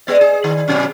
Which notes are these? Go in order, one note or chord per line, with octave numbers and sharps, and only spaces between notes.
G#3 B3 D5
G#4
D#3
B2 F#3 C#4